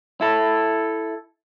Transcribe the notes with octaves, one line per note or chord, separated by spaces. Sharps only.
E4 A4